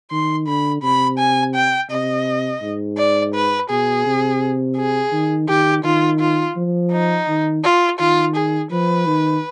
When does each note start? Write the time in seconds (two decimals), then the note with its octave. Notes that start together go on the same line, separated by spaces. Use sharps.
0.11 D#3 C6
0.47 D3 B5
0.83 C3 B5
1.18 G#5
1.55 G5
1.90 C3 D#5
2.62 G#2
2.98 D5
3.35 B4
3.70 B2 G#4
4.06 C3
4.77 G#4
5.12 D#3
5.49 D#3 G4
5.84 D#3 F4
6.20 F4
6.57 F3
6.92 D#4
7.28 D#3
7.64 F4
7.99 D#3 F4
8.36 G#4
8.71 F3 B4
9.07 D#3